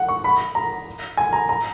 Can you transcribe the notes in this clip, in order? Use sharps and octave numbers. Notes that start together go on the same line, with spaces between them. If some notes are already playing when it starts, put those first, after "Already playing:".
Already playing: F#5
C#6
B5
A#5
G#5
A#5
A#5